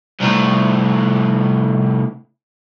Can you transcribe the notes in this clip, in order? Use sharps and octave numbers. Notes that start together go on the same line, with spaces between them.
C2 A2